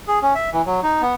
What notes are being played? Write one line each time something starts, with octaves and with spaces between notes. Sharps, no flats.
G#4
C#4
E5
E3
F#3
D#4
B3